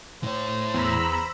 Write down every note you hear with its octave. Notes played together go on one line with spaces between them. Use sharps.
A2 C5 C#5
E2 A#5 B5 E6